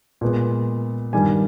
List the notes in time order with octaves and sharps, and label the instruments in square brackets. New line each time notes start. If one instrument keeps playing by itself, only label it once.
[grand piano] A#2 G#3 B3
G2 D#3 G3 G#5